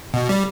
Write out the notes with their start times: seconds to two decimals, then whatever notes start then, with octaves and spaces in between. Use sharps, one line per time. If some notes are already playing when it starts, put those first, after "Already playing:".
0.14 B2
0.29 G3